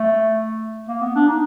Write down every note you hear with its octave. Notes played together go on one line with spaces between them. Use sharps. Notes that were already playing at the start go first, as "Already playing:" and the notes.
Already playing: A3
A#3
B3
D4
D#4